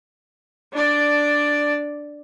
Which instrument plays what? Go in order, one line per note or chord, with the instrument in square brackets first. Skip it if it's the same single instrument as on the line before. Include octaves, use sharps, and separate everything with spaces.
[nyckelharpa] D4 D5